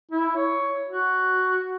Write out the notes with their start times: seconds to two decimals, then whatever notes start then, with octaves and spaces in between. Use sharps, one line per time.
0.11 E4
0.36 C#5
0.88 F#4